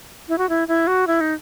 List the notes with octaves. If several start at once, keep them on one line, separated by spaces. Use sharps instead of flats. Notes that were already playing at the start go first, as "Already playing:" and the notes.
E4
F#4
E4
E4
F#4
E4
D#4